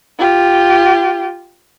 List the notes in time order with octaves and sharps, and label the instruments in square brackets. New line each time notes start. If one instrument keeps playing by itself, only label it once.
[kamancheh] F4 G4